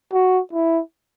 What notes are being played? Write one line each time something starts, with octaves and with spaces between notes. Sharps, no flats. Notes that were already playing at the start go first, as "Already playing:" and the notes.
F#4
E4